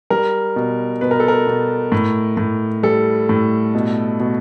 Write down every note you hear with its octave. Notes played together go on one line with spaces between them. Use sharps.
G3 A#4
B2
B2 B4
A#4
A4
A#4
B2
A2
A2
G3 A4
A2
B2
B2